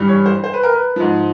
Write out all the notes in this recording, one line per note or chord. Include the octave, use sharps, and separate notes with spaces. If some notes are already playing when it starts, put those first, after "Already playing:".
Already playing: G2 E3 G3
C#5
C5
C5
B4
A#4
B4
G#2 F3